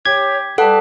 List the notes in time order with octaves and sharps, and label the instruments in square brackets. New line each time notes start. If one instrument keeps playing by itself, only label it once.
[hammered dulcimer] G4 [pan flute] C#5 [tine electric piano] G#6
[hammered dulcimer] G3 B4 [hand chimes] A4 F#5 [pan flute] A5